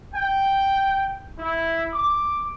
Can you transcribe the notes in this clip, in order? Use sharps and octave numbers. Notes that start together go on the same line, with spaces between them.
G5
E4
D6